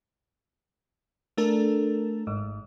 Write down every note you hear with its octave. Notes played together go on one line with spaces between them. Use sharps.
A3 D4 A4 A#4
G#1 G#2